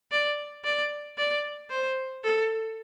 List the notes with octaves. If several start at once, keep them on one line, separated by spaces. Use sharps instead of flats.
D5
D5
D5
C5
A4